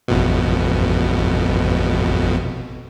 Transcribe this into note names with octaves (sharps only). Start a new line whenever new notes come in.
A1 F2 B2